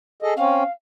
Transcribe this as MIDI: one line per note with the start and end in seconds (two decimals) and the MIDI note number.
0.22 0.34 68
0.22 0.34 69
0.22 0.34 75
0.36 0.63 60
0.36 0.63 61
0.36 0.70 77